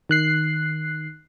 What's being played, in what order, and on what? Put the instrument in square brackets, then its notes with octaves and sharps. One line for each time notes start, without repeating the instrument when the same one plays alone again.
[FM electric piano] D#3 F#6 C7